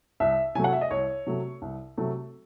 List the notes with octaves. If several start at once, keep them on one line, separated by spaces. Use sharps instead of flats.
C2 E5
C3 F#3 A3 G#5
F#5
E5
D#5
C2 C#5
C3 F#3 A3
C2
C3 F#3 A3